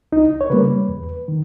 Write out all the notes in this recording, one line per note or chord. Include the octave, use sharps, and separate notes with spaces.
C#2 D#4
C#5
C#3 G3 A#3 B4
E2
D#3